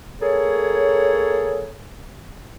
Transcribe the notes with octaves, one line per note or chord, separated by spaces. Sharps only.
A#3 G#4 A4 C#5